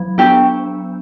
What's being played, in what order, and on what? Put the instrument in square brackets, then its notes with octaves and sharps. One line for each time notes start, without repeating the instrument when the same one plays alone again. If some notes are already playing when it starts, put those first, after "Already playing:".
Already playing: [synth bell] F#3
[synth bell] B3 D4 [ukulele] G4